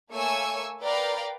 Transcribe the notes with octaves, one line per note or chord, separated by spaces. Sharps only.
A3 A#3 C#5 G#5 C#6 E6
A#4 B4 D5 F5 G5 A#5